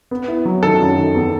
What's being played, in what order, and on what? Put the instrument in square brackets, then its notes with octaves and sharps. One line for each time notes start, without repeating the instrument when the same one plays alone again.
[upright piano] B3
E4
F#3
[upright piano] D#3 [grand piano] A4
[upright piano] F#2
D#3
E2